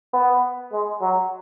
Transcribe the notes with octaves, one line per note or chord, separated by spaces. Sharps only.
B3
G#3
F#3